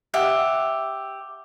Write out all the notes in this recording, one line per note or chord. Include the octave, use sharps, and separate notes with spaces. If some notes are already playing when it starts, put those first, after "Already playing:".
G4 E5 F#5